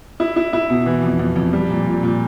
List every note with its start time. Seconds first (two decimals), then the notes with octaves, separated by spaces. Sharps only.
0.20 E4
0.36 E4
0.53 E4
0.70 B2
0.86 E3
1.03 F2
1.19 F2
1.36 F2
1.53 G3
1.70 A#2
1.87 A#2
2.03 A#2